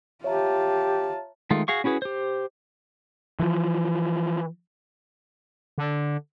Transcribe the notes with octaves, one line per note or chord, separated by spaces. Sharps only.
F4 G4 C#5 E5 A5 A#5
D#3 G#3 A3 F4
F#4 G#4 F5 C#6
C#4 E4 F#4 G#4 B4
G4 C5
E3 F3
D3